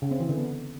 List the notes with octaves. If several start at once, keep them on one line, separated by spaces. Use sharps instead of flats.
C#3
C4
E3
D3
B3